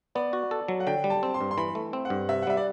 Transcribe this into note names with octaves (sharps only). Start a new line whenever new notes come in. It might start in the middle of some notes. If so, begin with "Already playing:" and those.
B3 D5
F#4
A4
F#3
F#5
D3 G5
G3
A5
C4
C6
G2
C6
E3 B5
A3
C4
F#5
G2
C3 E5
F#5
G3 E5
D5